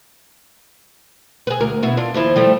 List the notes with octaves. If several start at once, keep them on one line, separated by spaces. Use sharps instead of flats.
G#4 B4
D2 A#4
B2 B3 E4
D4 F4
D#2 F3 E4
F3 G3 A3